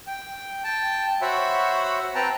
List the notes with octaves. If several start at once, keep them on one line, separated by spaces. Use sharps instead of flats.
G5
G5 A5
F#4 C5 C#5 E5 F#5 B5
C4 B4 G5 A5 A#5